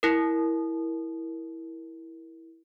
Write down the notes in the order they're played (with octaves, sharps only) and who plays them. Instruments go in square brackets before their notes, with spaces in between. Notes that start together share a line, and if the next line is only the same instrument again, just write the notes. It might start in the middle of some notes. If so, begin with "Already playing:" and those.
[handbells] E4 A#4